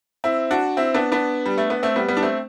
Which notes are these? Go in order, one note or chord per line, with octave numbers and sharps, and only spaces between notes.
C4 E4
D4 F#4
C4 E4
B3 D4
B3 D4
G3
A3
B3
A3 C4
G3 B3
G3 B3
D4
A3 C4